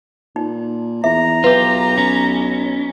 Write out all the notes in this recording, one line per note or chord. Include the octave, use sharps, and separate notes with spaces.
A#2 D#4
E2 E5 A#5
B1 F4 G4 B4
C#4